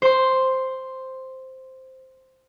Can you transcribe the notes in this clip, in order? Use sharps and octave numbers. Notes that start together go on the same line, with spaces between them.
C5 C6